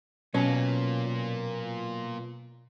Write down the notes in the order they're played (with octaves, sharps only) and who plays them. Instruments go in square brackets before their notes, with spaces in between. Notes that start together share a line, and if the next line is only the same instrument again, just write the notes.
[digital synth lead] B2 [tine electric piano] F#3 [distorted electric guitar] A#3 F4 [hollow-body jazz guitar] C#4